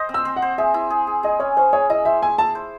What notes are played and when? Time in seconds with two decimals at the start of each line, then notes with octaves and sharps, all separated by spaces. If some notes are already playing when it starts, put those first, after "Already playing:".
Already playing: C5 D#5
0.09 C4
0.14 E6
0.25 C4
0.36 F#5
0.42 C5
0.58 G#4 E5
0.74 E4
0.90 G#4
1.07 G#4
1.23 G#4 D#5
1.40 C#4 C#5
1.57 C#4 C5
1.73 G#4 C#5
1.90 E4 D#5
2.05 C5 E5
2.22 E4 G#5
2.38 E4 A5
2.55 C5